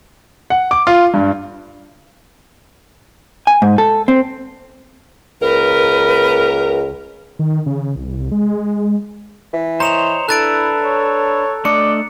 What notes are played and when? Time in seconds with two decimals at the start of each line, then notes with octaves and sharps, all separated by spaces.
0.50 F#5
0.71 D6
0.87 F4
1.14 G2
3.47 G#5
3.62 G#2
3.78 A4
4.08 C4
5.42 C#2 A#3 A#4 B4
7.39 D#3
7.66 C#3
7.96 C2
8.17 C2
8.32 G#3
9.53 E3
9.80 C5 C#5 D#5 A#5 E7 F7
10.29 D4 E4 A4 B4 E5 F#6 A6 D7
10.84 C#5
11.65 A3 D4 D5 D#5 C#7